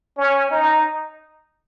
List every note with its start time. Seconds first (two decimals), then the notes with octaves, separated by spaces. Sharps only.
0.17 C#4
0.51 D#4